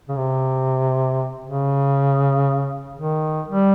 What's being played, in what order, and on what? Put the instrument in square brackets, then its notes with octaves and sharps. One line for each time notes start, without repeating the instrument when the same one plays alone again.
[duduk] C#3
C3
C#3
D#3
G3